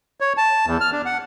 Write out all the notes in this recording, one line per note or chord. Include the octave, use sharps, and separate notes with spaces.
C#5
A5
E2
F6
D4
F#5